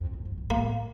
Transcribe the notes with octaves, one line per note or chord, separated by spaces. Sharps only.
F2
F#2
G2
G#2
A2 A#3